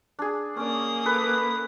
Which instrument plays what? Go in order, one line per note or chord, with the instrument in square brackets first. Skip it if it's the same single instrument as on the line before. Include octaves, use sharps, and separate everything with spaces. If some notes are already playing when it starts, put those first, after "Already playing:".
[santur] D4 G#4
[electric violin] A#3 D#6 [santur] C#4 D5
[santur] A4 B4